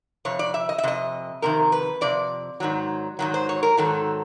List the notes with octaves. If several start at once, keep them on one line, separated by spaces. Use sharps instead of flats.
F2 C3 C#5
D5
E5
D#5
E5
F2 C3 D#5
F2 C3 D#3 A#4
B4
F2 C3 D5
G#2 D#3 F#3
G#2 D#3 F#3
C5
C#5
A#4
G#2 D#3 F#3 A4